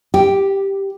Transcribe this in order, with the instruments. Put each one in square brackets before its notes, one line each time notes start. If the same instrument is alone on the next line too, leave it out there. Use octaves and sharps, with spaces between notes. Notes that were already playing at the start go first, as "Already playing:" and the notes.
[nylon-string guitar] G4